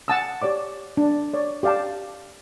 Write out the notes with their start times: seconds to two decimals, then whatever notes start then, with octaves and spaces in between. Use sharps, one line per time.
0.08 F#5 G#5 A5 D#6 E6
0.42 G4 C#5 D5 D6
0.97 D4
1.34 C#5 D5
1.63 G4 D5 F5 G5 A5